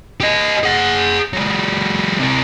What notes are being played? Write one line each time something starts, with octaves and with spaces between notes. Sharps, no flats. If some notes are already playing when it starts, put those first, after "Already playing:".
G4 D#5
G#4 F#5
F#3 G#3
C3 A#4